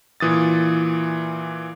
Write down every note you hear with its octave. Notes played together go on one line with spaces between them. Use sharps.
A#2 E3 D#6 A6